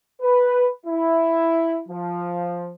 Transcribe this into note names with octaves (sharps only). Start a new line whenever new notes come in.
B4
E4
F3